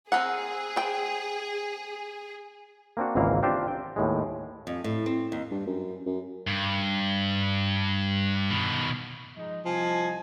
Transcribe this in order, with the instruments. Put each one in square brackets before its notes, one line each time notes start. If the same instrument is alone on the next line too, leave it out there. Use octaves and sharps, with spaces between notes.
[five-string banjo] C4 A#4 F#5 [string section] G#4
[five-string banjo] C5 G5
[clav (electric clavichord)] A#3 C4 D4 F#4
G#1 C#2 G#2 E3 A#3 F5
C4 D4 F4 G4 C5
G5
D#2 A2 G#3
[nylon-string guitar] F2
A2
C4
D#2
[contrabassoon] G2
F#2
F#2
[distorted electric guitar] G2
B2 D#3
[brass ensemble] F3 G#3 D#4
[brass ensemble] C2 D#5 G#5 [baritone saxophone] F3